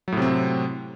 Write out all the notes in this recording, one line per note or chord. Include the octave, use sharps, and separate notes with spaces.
A2 C3 F#3 C4